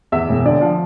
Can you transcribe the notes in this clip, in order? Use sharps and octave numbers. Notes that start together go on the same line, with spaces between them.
E2 E5
E1
D3 D5
F3